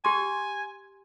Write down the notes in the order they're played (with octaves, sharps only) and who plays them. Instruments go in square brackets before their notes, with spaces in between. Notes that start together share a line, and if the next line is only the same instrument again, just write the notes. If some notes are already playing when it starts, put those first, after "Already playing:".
[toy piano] G4 C6 [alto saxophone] G#5